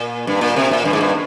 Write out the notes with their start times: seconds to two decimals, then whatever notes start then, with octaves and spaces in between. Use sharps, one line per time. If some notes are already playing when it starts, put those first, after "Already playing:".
Already playing: A#2
0.27 G2
0.41 A#2
0.56 C3
0.71 A#2
0.85 G2
0.93 G#2
1.01 G2